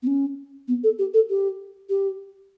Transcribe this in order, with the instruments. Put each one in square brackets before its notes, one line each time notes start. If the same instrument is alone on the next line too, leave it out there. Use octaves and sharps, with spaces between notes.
[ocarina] B3
C#4
B3
A4
G4
A4
G4
G4